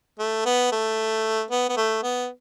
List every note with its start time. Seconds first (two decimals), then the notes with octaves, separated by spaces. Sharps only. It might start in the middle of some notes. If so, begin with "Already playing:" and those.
0.19 A3
0.46 B3
0.72 A3
1.51 B3
1.69 B3
1.77 A3
2.03 B3